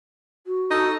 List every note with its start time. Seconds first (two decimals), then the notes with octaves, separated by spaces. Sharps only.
0.46 F#4
0.71 D#4 A4